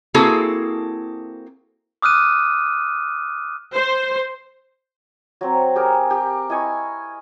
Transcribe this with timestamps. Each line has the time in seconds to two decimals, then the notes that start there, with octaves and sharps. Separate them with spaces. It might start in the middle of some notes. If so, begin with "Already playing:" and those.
0.14 A#3 C4 E4 F#4 G#4 A4
2.02 D6 D#6 F6 F#6 D#7
3.75 C5
5.41 F#3 C4
5.76 G4 G#4 A#4
6.10 G4
6.50 E4 D#5 G#5 C#6